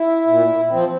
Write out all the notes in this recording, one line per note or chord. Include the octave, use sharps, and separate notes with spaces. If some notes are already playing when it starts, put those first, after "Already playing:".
Already playing: E4
A#2
F3 C4